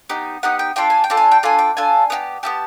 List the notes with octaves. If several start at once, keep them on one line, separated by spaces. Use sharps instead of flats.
B3 D#4 G4
B3 D#4 G4 F#5
G5
D4 F4 A4 G5
G#5
G5
D4 F4 A4
G#5
G5
D4 F4 A4 G#5
G5
D4 F4 A4 G#5
B3 E4 G4
B3 E4 G4 A5